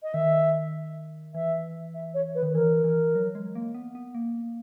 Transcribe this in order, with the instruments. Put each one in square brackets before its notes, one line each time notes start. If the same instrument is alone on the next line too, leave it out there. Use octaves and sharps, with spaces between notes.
[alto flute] D#5
[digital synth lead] D#3 [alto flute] E5
[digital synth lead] E3 [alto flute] E5
[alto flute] E5
C#5
B4
[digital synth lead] D#3
[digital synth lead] E3 [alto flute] A#4
[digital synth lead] E3
F#3
G#3
A#3
B3
B3
A#3